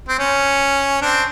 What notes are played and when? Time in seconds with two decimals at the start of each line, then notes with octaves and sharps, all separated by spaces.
0.08 C4
0.19 C#4
1.02 C4 D4